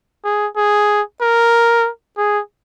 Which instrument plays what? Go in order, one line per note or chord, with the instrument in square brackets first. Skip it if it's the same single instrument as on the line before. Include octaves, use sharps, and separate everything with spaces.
[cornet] G#4
G#4
A#4
G#4